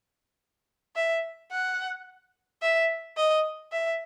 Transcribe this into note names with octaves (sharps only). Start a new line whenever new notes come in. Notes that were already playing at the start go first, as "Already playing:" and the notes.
E5
F#5
E5
D#5
E5